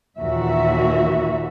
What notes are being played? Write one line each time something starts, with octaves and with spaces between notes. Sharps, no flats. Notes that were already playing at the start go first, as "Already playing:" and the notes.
D#2 A#2 E3 F#4 E5